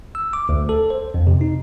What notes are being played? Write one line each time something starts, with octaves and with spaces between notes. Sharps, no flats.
E6
D6
D2
A4
C5
F2
C3
D#4